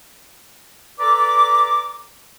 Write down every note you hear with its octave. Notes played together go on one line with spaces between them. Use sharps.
A4 B4 D5 A#5 D6